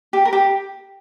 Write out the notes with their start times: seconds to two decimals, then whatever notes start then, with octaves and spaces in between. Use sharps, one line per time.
0.13 G4
0.25 A#4
0.33 G4